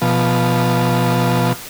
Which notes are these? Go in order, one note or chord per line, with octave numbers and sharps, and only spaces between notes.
B2 F3